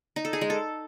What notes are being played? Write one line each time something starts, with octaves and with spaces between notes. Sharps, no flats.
D#4
A4
G#4
G#3
A4